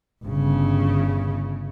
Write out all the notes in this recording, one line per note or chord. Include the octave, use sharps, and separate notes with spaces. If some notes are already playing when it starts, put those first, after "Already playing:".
G1 C#3